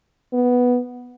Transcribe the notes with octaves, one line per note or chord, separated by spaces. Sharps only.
B3